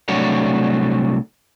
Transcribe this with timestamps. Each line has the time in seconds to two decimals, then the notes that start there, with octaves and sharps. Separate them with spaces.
0.08 C2 F#3 A3 D4 C#5